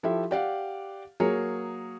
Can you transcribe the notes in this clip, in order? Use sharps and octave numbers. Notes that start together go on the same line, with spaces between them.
F3 E4 G4 A4 E5
G4 D5 F5 F#5
F#3 A#3 G#4 A#4 C#5